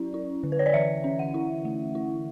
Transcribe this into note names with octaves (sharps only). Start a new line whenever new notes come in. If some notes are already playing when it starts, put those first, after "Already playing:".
Already playing: F#3 C#4 E4 D5
E4
D3
B4
C#5
D5
E3 E5
C#4
F#5
E4
A3
E4